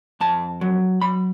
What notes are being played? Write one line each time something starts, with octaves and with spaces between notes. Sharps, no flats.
F2 A5
F#3
F#3 B5